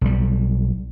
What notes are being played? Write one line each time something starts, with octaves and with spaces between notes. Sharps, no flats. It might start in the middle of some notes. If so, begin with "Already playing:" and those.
B1 G3